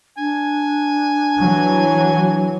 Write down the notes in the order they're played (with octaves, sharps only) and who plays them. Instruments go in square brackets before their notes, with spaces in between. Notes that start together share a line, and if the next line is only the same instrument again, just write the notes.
[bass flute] D4 [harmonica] G#5
[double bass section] E3 F#3